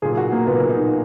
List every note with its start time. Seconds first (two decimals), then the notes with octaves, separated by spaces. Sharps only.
0.02 B1 A#2 G#4
0.17 F#4
0.32 A#3
0.47 B1 A#2 B3
0.69 D#4